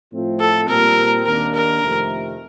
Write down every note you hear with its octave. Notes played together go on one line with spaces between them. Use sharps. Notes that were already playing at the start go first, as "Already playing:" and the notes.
A2 F3 A3 C4 F4
A4
A#2 G3 C4 A#4
D#2 D#3 A#3 D4 A#4
A#4
F2 C3 D#3 A3